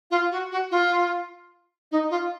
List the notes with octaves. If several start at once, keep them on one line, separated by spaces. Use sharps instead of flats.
F4
F#4
F#4
F4
D#4
F4